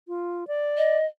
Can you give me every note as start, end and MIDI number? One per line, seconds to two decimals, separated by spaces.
0.08 0.47 65
0.48 0.98 74
0.77 1.05 75